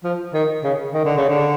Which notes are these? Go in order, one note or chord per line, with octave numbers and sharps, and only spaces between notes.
F3
D#3
C#3
D#3
D3
C#3
D3